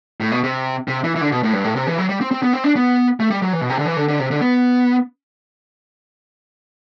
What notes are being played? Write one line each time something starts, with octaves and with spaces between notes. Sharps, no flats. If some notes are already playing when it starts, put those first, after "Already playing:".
A2
B2
C3
C3
E3
E3
D3
B2
A2
G2
A2
C3
E3
F#3
G3
C4
C4
B3
C4
D4
B3
A3
G3
F#3
E3
B2
C3
D3
E3
D3
D3
C3
D3
B3